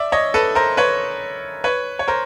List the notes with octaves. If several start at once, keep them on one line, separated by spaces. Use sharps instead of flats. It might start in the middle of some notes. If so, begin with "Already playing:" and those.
Already playing: D5 E5
C#5 D#5
A4 B4
A#4 C5
B4 C#5
B4 C#5
C#5
A#4 C5